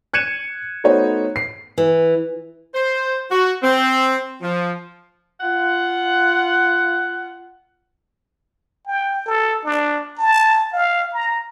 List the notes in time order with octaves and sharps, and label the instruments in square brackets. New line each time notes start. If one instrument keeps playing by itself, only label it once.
[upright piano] F#6 G#6 C#7 D#7 E7
A3 B3 D#4 F#4 C5 C#5
C7
[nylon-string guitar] E3
[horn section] C5
F#4
C4
F3
F4 F#5
[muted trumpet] G5
A4
D4
A5
F5
A#5